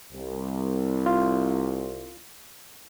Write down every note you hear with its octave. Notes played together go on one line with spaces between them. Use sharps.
C2
F4